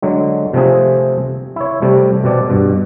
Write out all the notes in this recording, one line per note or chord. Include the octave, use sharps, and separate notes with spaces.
D3 F#3 G#3
C3 F3 A3 C4 G#4
E4 C#5
C3 G3 A3
B2 C4 D5 A5
G2 B2